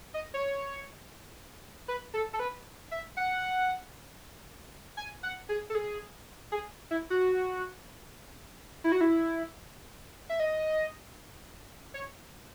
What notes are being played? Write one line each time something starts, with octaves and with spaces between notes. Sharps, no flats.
D#5
C#5
B4
A4
A4
B4
E5
F#5
G#5
F#5
G#4
A4
G#4
G#4
E4
F#4
E4
F#4
E4
E5
D#5
C#5